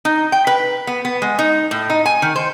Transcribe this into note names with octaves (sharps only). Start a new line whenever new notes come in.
D#4
G5
B4
B3
B3
G#3
D#4
A2
D#4
G#5
D#3
C5